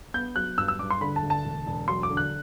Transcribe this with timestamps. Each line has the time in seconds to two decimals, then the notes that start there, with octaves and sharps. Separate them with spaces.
0.14 B3 G6
0.36 F#3 F#6
0.58 G2 E6
0.68 E6
0.79 G2 D6
0.91 C6
1.01 D3 B5
1.16 A5
1.23 D2
1.30 A5
1.44 E1
1.66 E1
1.88 F#3 C6
2.03 D6
2.10 D3
2.17 F#6